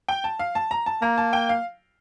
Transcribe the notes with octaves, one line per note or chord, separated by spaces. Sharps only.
G5
A5
F5
A5
A#5
A5
A#3 A#5
A5
G5
F5